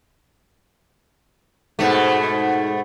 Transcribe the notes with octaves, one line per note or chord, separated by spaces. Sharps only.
G#2 B2 A3